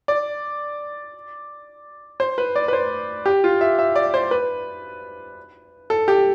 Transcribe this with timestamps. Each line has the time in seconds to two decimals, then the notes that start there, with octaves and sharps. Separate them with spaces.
0.08 D5
2.20 C5
2.38 B4
2.56 D5
2.68 B4
2.73 C5
3.26 G4
3.44 F4
3.61 E5
3.79 E5
3.96 D5
4.14 C5
4.31 B4
5.90 A4
6.08 G4